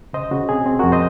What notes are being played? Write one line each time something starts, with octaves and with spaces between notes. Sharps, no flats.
C#3 C5 D#5
C#3 F#4
C4 G#4
C4
F2 F#4 A#4
C5 D#5